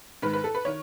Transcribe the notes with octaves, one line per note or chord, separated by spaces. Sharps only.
G#2 D#3 B4
B4
A4
B4
D#3 C#5